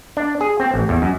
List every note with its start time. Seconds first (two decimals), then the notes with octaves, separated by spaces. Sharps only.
0.17 D4
0.41 G#4
0.60 C4
0.74 A1
0.89 E2
1.02 F#2